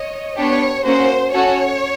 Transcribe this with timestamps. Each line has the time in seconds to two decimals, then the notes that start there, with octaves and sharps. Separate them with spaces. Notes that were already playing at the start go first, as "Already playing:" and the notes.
Already playing: C#5 D#5
0.36 B3 D4 G4 C#5
0.84 A#3 C#4 F#4 C5
1.33 C#4 F#4 A4 C#5